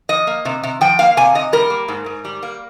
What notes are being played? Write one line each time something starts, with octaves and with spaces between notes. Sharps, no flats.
F3 D#5
A#3
C3
C3
F3 G5
A#3 F5
C3 G#5
C3 D#5
G3 A#4
A#3
G#2
G#2
G3
A#3